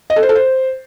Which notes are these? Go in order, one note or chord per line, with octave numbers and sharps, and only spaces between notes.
D#5
A4
C5
A4
C5